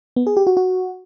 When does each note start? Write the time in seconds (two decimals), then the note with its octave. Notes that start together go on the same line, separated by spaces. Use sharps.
0.16 B3
0.27 G#4
0.37 G4
0.47 F#4
0.57 F#4